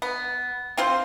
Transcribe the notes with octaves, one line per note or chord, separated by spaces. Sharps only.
B3
C4 F4 C5